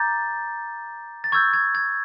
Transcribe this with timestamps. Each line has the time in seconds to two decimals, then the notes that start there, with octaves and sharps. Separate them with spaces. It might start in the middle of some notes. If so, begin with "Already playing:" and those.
Already playing: A#5 D6 G6 A6
1.24 A6
1.32 C#6 E6 G6 G#6
1.54 G#6
1.75 G#6